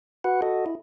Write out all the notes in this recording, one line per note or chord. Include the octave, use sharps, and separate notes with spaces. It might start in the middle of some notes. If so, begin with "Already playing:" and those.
F#4 B4 F#5
F#4 A4 D#5
E4